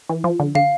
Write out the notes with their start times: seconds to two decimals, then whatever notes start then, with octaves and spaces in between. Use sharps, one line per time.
0.09 E3
0.24 F3
0.40 D3
0.55 D3 F5